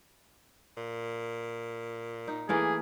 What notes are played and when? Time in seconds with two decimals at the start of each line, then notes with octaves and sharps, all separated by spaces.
0.77 A#2
2.28 D#4
2.49 E3 A3 A#3 G#4